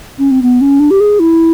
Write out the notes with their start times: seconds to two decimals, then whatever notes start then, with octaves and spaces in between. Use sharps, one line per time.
0.19 C#4
0.31 C4
0.42 B3
0.61 C#4
0.80 D4
0.91 G4
1.00 G#4
1.20 E4